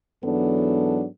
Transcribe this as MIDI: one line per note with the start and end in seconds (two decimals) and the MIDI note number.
0.24 1.05 44
0.24 1.05 52
0.24 1.05 54
0.24 1.05 59
0.24 1.05 62
0.24 1.05 69